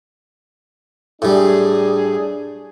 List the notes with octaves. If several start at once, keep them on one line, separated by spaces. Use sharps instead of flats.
A2 G3 D4 G#4